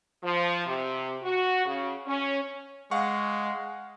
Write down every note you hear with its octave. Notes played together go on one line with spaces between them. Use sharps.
F3
C3
F#4
C#3
C#4
G#3 F5 F#5 C#6